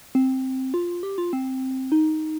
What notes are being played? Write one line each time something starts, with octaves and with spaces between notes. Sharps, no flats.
C4
F4
G4
F4
C4
D#4